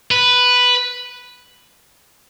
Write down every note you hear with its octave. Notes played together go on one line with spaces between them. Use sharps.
B4